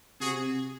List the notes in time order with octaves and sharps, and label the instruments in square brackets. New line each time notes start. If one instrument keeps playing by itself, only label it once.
[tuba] C3 [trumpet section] F#4 G#4